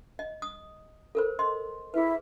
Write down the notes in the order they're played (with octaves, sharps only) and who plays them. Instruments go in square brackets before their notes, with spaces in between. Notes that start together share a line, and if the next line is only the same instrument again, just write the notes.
[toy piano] D#5
D#6
A4 A#4 C5
D#5 C6
[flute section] E4 E5 [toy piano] G#4 B4